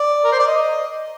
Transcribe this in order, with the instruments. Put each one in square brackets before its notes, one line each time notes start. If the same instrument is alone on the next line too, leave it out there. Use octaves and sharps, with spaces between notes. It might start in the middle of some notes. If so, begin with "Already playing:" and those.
Already playing: [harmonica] D5
A#4
C5
D5
D#5